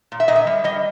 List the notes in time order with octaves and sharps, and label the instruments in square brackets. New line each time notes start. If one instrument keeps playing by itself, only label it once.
[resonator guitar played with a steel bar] A#2
E5
A#2 D#5
E5
G3
G3 D#5